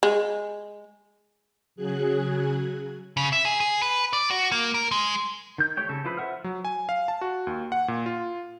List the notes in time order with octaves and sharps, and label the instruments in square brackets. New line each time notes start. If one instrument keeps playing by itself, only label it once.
[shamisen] G#3
[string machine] C#3 F#3 G#4 F#6 G#6
[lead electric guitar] C#3
E5
G#4
G#4
B4
D5
F#4
A#3
A#4
G#3
[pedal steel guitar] D#3 G6
A3 G4 C#5 G5
C#3 A4
F3 E4 F4 B4 B5
A4 C5 E5 F#5 F6
[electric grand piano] F#3
G#5
F5
A5
F#4
D#2
F#5
A#2
F4